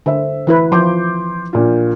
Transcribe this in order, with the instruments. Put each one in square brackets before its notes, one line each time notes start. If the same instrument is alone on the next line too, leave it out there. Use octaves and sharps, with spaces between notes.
[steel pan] D3 [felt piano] C5 E5
[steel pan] E3 E4 B4
[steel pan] F3 [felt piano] C6 D6 G6
[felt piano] A#1 A#2 F4